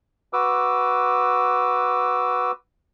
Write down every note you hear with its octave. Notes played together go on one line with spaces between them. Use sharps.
F#4 B4 D6 E6